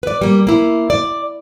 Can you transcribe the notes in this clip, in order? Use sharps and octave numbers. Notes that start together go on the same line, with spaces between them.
B4 D5
G3 A#3
A#3 E4
D5